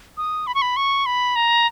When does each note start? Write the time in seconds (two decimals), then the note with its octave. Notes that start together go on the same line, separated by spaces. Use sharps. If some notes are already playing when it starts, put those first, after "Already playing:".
0.17 D#6
0.47 B5
0.55 C#6
0.62 B5
0.77 C#6
1.06 B5
1.36 A#5